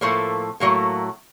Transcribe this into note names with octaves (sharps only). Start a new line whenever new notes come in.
A2 F3 A3 A#3
A2 F#3 A3 A#3